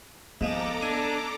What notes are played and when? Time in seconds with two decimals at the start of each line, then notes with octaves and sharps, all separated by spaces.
0.41 G#2 F3 G#3 B3 A4 A#5 D6
0.82 D4 G#5